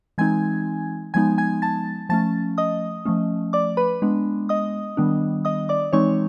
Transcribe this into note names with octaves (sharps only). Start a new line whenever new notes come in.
E3 G#3 C4 D#4 G#5 G#6
F3 G#3 B3 D#4 G#5 G#6
G#5 G#6
A5 A6
F3 A3 C#4 A5 A6
D#5 D#6
F3 A3 C#4
D5 D6
B4 B5
G#3 B3 D4
D#5 D#6
D#3 G3 B3 D4
D#5 D#6
D5 D6
E3 G#3 C4 D#4 C#5 C#6